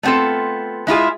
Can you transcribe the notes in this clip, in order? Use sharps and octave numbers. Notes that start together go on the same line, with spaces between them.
A3 B3 C4 F4 A4
G#3 E4 F4 G#4